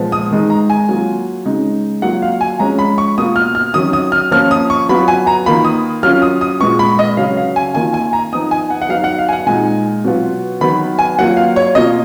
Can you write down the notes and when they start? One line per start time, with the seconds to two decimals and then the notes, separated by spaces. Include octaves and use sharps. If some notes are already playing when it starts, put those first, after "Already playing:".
Already playing: A#2 F3 G#3 B3
0.12 D#6
0.31 D#3 G#3 D#4
0.50 A#5
0.70 G#5
0.89 F#3 A#3 F4
1.45 C#3 G#3 D#4
2.02 F#3 A#3 F4 F#5
2.22 F5
2.41 G#5
2.59 F3 G#3 C#4 A#5
2.79 B5
2.98 C#6
3.18 B2 A#3 F4 D#6
3.36 F6
3.55 F6
3.74 D#3 F#3 C#4 D#6
3.93 D#6
4.12 F6
4.31 F3 A#3 C#4 F4 F6
4.51 D#6
4.70 C#6
4.89 F#3 B3 F4 B5
5.08 G#5
5.27 A#5
5.46 D#3 A#3 F4 B5
5.65 D#6
6.03 F#3 C#4 F4 F6
6.22 D#6
6.41 D#6
6.61 A#2 G#3 B3 C#6
6.79 B5
6.99 D#5
7.17 C#3 F#3 C#4 F5
7.37 F5
7.56 G#5
7.75 D#3 A#3 F4 G#5
7.94 G#5
8.13 A#5
8.33 F3 B3 D#4 D#6
8.51 G#5
8.70 F#5
8.82 F#5
8.89 F#3 B3 D#4 F5
9.04 F#5
9.18 F5
9.29 G#5
9.33 F#5
9.46 A#2 G#3 D#4 G#5
10.04 B2 F#3 B3 F4
10.61 D#3 F#3 B3 B5
10.99 G#5
11.18 F#3 A#3 F4 F#5
11.37 F5
11.56 C#5
11.75 B2 A#3 F4 D#5